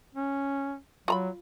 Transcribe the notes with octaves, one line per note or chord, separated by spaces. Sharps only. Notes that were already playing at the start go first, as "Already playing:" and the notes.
C#4
F#3 F4 A#5 B5